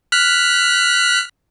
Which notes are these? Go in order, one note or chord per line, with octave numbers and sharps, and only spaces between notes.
F6 F#6 B6